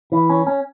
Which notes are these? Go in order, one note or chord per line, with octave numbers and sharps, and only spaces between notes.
E3
C#4
C#4